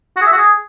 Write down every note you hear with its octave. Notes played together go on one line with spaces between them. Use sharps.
F#4
G#4
E5
F#4
G#4